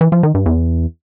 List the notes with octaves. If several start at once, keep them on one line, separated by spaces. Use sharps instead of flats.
E3
F3
D#3
G2
E2